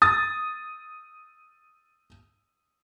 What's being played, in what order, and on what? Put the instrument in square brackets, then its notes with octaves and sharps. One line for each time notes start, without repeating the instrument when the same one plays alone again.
[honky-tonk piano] D#6 A6